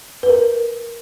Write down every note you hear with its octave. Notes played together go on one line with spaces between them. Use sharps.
B4
A#4